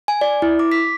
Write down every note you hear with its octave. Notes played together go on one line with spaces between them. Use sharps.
G#5
D5
E4
D6
B6